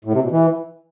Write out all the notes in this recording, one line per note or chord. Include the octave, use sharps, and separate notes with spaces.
A2
C3
B2
E3